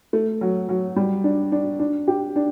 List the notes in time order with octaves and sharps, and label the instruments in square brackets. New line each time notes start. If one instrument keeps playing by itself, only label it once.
[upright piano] A3
F#3
F#3
G3
D4
D4
D4
G4
D4